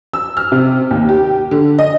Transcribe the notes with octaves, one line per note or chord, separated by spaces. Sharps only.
E6
F6
C3
D#2
G4
D3
D#5